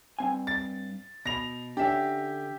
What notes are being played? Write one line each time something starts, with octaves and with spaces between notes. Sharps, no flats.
G2 C4 G#5
A6
B2 B5 A#6 F7
D3 C#4 D4 G4 E5